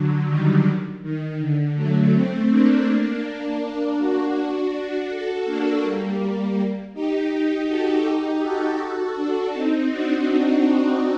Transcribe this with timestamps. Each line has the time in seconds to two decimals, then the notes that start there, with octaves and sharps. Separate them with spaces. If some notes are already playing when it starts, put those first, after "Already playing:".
Already playing: D3 F#3
0.28 D#3 G3
1.02 D#3
1.40 D3
1.76 F#3 A3
2.13 A3 C4
2.50 A#3 D4
3.61 A#3 D4
3.98 D4 F#4
5.09 F#4 A4
5.46 A#3 D4
5.83 G3 A#3
6.94 D#4 G4
7.67 F#4 A4
8.04 D#4 G4
8.42 F#4 A4
9.16 D4 F#4
9.53 C4 D#4
9.90 D4 F#4